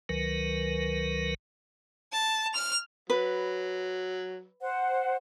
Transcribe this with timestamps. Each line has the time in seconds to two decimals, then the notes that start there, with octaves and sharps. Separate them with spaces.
0.09 C#2 D#3 F#3 A#4 B4
2.12 A5
2.53 F6 F7
3.10 F#3 B4
4.61 C5 F#5